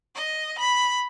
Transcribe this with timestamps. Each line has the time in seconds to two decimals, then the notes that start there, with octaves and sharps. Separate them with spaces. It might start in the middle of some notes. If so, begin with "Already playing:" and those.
0.15 D#5
0.58 B5